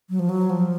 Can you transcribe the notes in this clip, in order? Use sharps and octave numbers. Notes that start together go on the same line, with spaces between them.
F#3
F3
F#3
F3